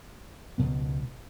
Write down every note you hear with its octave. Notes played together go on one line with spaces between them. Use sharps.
C#2 B2 B3